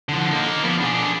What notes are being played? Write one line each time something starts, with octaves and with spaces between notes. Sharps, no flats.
D3 F3
A#3 D#4
F3 B3
D4 G#4